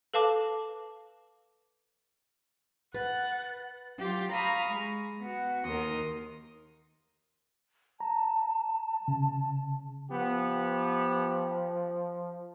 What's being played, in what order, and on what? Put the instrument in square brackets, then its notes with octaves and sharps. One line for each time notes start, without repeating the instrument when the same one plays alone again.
[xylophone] A4 B4 F5 A5 D6
[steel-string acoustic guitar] B4 [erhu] F#5 [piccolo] A6
[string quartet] F#3 F4 G4
F5 A#5 B5 C#6 D#6 F6
G#3
B3 F#4
D#2 D#3 A#4 C6 D#6
[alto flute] A5 [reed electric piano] A#5
[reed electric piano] C#3
[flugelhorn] F3 [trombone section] B3 G4